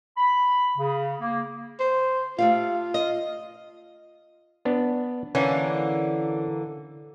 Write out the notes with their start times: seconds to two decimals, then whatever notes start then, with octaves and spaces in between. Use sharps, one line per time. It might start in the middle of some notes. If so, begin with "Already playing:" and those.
0.17 B5
0.78 C#3
1.21 A#3
1.80 C5
2.39 A3 F4 G4 F5
2.94 D#5
4.65 B3 D4
5.35 D3 E3 A#3 C#4